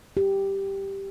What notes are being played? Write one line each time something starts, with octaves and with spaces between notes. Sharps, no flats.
G4